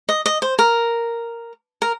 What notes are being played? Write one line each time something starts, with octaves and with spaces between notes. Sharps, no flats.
D#5
D#5
C5
A#4
A#4